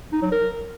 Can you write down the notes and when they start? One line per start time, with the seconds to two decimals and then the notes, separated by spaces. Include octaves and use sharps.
0.13 D#4
0.22 F#3
0.32 A#4